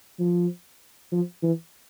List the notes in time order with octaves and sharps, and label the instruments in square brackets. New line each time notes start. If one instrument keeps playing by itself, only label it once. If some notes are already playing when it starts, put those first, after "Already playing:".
[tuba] F3
F3
E3